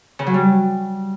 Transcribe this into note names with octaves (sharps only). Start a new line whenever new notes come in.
C#3
F#3
G3